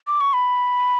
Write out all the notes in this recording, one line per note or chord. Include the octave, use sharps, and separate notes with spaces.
D6
C#6
B5